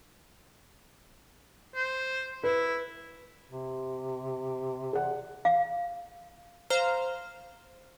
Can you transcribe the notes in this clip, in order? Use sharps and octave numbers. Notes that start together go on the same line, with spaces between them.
C5
E4 B4
C3
G#4 D5 F#5
F5
C5 F5 A#5 F6